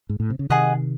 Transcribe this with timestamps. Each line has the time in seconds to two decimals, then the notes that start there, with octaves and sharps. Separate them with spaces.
0.09 G#2
0.20 A2
0.30 C3
0.39 C#3
0.50 C3 D#3 G#4 D#5 F#5